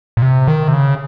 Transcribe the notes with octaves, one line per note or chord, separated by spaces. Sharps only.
A#2
C3
D#3
C3
C#3